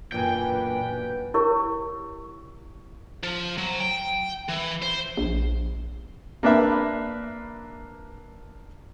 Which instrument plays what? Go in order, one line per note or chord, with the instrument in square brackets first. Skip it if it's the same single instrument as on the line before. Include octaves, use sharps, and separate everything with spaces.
[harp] E1 F#2 G#5 [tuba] A#2 [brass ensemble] D4 F4 B4 [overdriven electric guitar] G5
[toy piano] E4 G4 A#4 C#5 C#6
[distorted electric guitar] F3
F#3
G5
E3
C5
[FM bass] A#1
[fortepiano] A#3 D4 B4 E5